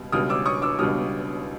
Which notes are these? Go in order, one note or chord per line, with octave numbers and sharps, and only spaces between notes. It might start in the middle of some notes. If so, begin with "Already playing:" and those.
Already playing: C#2 B2 G3
C#2 B2 G3 D#6 F6
D6 E6
C#6 D#6
D6 E6
C#2 B2 G3 D#6 F6